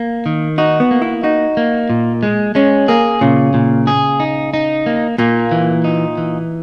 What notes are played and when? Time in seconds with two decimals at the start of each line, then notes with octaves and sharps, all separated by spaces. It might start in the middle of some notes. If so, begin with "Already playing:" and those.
Already playing: A#3
0.26 D#3
0.58 D#4 F#4
0.80 B3
0.91 A#3
1.02 E4
1.23 D#4 F#4
1.57 A#3
1.90 A#2
2.23 G#3
2.55 G#3 C#4
2.88 A#3 G#4
3.21 A#2 C#3
3.54 A#2
3.87 G#4
4.20 D#4
4.54 D#4
4.86 A#3
5.18 A#2 A#3
5.51 E3
5.84 D#4
6.18 E3